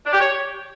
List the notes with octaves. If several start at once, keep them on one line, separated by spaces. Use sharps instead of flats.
D4
G4
C#5